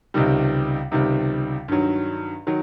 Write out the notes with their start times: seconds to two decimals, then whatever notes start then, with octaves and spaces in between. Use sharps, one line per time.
0.14 C#2 C3 D#3 G3
0.92 C#2 C3 D#3 G3
1.68 G2 D#3 F#3
2.47 D#3 F#3